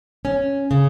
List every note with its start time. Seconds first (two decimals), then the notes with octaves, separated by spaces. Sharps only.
0.25 C#4
0.71 C#3